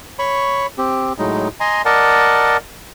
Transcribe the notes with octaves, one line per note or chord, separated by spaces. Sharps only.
C#5 B5 C#6
C4 G4
A2 F#3 G#3 D#4
D#5 G#5 A#5 C6
A#4 D5 D#5 F#5 A5